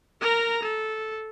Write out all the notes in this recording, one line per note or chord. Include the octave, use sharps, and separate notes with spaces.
A#4 A#5
A4